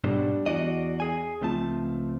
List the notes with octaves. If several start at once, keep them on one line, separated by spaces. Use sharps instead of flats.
G#2 B2 F#3 G3 D4 D5
E2 F#4 D5 D#5
G#4 G#5
C#2 F3 A3 C4 A5